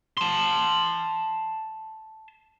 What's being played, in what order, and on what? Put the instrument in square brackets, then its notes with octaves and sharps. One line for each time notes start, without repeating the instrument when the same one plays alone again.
[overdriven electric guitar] A5 C6